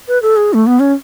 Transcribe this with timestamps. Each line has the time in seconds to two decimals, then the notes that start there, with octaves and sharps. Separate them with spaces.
0.08 B4
0.22 A4
0.36 G#4
0.54 A3
0.67 B3
0.80 C#4